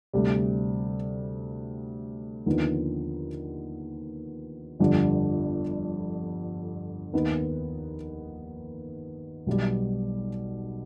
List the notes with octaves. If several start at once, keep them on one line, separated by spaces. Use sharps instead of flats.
D2 C3 G3
D#2 D3 F3 B3 D#4
G1 F2 D3 G3
D#2 D#3 B3 D#4 B4
B1 B2 G3